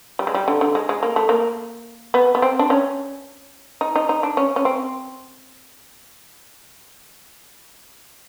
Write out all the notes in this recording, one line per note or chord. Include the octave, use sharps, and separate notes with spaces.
G3
G#3
G3
D3
D3
G#3
G#3
A#3
A3
A#3
B3
B3
C4
D4
C#4
D#4
D#4
D#4
D4
C#4
C#4
C4